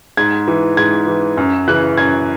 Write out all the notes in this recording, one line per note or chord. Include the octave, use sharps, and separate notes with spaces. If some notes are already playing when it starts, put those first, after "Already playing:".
G#2 G#6
E3
G#2 G#6
E3
F#2
C#3 E3 F#6
F#2 G#6